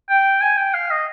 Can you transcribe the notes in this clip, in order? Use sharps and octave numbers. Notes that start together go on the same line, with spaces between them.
G5
G#5
G5
F5
D#5